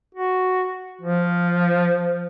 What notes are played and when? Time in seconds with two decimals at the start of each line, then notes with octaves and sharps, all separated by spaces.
0.15 F#4
1.01 F3